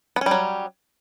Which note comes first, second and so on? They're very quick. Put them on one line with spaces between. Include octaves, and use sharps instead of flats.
B3 C#4 G3 F#3